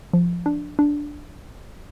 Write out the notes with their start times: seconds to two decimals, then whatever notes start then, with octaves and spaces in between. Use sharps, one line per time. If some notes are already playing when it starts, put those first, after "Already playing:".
0.13 F3
0.46 D4
0.79 D4